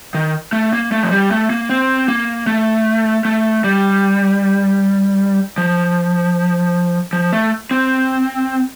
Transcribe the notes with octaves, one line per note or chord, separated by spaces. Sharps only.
D#3
A3
A#3
A3
F3
G3
A3
A#3
C4
A#3
A3
A3
G3
F3
F3
A3
C4